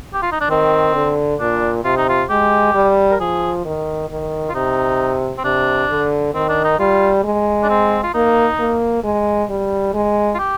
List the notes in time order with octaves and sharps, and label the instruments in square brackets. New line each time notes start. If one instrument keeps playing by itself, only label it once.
[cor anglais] G4
F4
D#4
D4
[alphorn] D#3 [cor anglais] C4
[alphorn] D3
[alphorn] A#2 [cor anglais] D4
[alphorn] C3 [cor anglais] F4
[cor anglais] D#4
F4
[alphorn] G#3 [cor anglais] G4
[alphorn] G3
[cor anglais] A#4
[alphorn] F3 [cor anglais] G#4
[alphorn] D#3
D#3
[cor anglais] F4
[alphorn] C3 [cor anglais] D#4
[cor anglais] C4
[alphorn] C3 [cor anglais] D4
[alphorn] D3
[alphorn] D#3 [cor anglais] C4
[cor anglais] D4
D#4
[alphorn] G3 [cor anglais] F4
[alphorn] G#3
[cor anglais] D4
C4
F4
[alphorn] A#3 [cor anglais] D#4
[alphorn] A#3
G#3
G3
G#3
[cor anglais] F4
G4